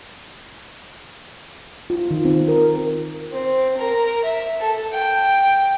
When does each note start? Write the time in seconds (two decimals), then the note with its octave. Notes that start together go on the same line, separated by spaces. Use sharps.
1.90 F4
2.11 D#3
2.25 C4
2.48 A#4
3.32 C4
3.77 A#4
4.25 E5
4.60 A4
4.93 G5